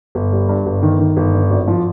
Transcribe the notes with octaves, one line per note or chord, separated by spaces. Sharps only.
G1
G3
G2
G1
D#3
D#3
G1
G2
G#1
F3